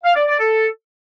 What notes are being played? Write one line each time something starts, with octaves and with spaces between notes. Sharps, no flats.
F5
D5
D5
A4